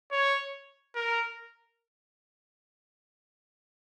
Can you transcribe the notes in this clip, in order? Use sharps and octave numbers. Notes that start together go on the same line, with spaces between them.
C#5
A#4